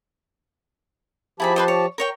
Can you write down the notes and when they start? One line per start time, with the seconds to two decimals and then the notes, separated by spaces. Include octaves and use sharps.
1.40 F3 E4 G4 G#4 A5 B5
1.56 B4 C5 D#5
1.68 C#5
1.98 A#4 C#5 G5